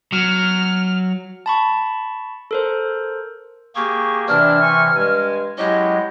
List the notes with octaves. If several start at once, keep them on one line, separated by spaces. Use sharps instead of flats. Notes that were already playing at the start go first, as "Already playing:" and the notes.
F#3 F6
A5 B5 C#6
A4 A#4 C5
A#3 G4 G#4 C#6
C3 E3 D4 F6
G#5 B5 C#6
G2 G#3 G#5
F#3 G#3 C#4 E4 G4 D#5